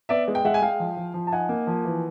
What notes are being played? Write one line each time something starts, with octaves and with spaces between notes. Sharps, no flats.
B3 D5 E5
G#3
G5
G#3 E5 F#5
G#5
G#3 F5 G5
F3
F3
F3
A5
D#4 F#5 G#5
A#3
F3
E3